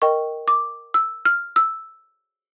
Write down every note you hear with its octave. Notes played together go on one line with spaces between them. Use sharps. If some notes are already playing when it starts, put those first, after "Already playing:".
A#4 D#5 G5 C#6
D6
E6
F6
E6